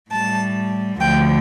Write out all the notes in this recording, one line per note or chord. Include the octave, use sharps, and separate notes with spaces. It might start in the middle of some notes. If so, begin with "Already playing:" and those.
A2 G3 A5
D2 D3 F3 A3 G5